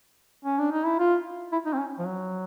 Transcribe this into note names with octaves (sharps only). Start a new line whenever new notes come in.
C#4
D4
D#4
E4
F4
E4
D#4
C4
C#4
F3
F#3